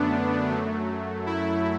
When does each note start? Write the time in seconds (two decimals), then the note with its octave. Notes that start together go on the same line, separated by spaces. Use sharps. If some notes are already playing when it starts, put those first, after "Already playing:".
Already playing: F#2 D3 A3 B3 D4
0.50 F#2 F#3 A3
1.26 E4